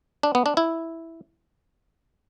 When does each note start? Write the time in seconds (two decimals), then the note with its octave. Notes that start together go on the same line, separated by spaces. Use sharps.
0.23 D4
0.35 B3
0.46 D4
0.57 E4